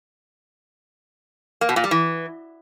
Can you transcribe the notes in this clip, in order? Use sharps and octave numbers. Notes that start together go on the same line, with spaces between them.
A#3
B2
A#2
G3
E3